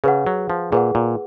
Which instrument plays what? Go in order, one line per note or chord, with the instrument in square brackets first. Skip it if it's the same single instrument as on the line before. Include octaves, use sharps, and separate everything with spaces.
[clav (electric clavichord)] C#3 [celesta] G#4 B4 F#5
[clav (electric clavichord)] F#3
F3
[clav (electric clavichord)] A#2 [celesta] G#4 B4 F#5
[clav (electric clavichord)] A#2